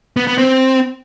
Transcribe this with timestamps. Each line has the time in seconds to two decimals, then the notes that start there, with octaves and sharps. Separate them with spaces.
0.17 B3
0.27 B3
0.38 C4